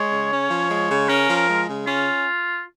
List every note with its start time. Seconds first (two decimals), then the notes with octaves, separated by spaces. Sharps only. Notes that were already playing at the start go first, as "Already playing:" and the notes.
Already playing: G#3 C#5
0.11 C#3
0.30 C#4
0.50 F3
0.69 G#3
0.89 C#3
1.09 C#4 A#4
1.28 F3
1.35 A#4
1.48 G#3
1.67 C#3
1.86 C#4 F4